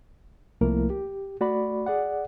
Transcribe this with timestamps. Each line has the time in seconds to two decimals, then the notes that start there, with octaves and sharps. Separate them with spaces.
0.61 C2 F3 A3 A#3 E4 A#4
0.90 G4
1.40 A3 F#4 D5 B5
1.86 G#4 D5 F#5